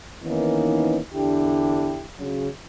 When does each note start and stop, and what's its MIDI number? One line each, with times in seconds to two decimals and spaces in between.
0.24 0.99 51
0.24 0.99 52
0.24 0.99 58
0.24 0.99 59
0.24 0.99 61
0.24 0.99 63
1.14 2.05 40
1.14 2.05 50
1.14 2.05 62
1.14 2.05 64
1.14 2.05 67
2.18 2.48 49
2.18 2.48 54